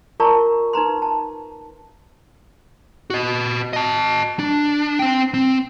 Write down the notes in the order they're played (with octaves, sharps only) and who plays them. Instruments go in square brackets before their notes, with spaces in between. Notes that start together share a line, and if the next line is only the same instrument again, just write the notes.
[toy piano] F4 A#4 D5 A5 A#5 C#6
D#4 B4 A#5 C6
A5
[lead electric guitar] F#4 D#5
D#5 A5
D4
C4 G5
C4